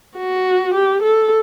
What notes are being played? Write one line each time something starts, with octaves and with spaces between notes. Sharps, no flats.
F#4
G4
A4